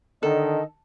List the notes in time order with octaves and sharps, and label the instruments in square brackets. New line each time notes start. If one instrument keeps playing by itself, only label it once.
[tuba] D3 [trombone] D#3 [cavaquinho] A4 [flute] D#5